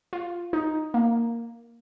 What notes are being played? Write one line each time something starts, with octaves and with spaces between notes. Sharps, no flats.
F4
D#4
A#3